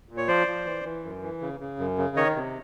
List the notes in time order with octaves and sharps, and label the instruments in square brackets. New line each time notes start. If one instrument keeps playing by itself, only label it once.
[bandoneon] A#2
C#5
F3 C5 D5
F3
E3
E3
F#2
E3
C#3
C#3
F#2
C#3
D#3 C#5 D#5
C3